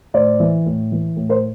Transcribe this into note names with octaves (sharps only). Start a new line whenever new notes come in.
A2 C5 D5
E3
A2
E3
A2
A#4 C5